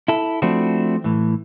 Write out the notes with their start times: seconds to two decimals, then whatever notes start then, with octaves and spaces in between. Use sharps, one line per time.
0.08 E4 A4
0.42 F3 A3 C4 D4 E4 F#4
1.04 A2 E3